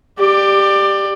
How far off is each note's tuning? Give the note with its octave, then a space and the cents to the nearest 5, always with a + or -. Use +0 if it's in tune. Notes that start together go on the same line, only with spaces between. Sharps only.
G4 +5 D5 +20